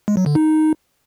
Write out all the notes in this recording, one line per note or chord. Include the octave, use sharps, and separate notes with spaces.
G#3
F#3
D3
D#4